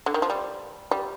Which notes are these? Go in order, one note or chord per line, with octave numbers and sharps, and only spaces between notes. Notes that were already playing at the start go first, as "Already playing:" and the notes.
D3
D#3
F3
G3
G3